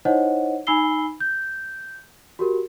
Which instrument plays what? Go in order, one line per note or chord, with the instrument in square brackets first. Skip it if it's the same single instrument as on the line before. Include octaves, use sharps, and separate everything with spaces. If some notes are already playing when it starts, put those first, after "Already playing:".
[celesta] D#4 E4 C5 C#5 D#5 F#5
D#4 G#5 B5 E6 C7 G7
G6
F#4 G4 A#4